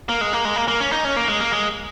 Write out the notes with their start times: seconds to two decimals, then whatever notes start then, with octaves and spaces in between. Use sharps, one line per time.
0.09 A#3
0.21 G#3
0.33 A#3
0.45 G#3
0.56 A#3
0.68 A#3
0.80 C#4
0.92 D#4
1.05 C#4
1.16 A#3
1.28 G#3
1.40 A#3
1.53 G#3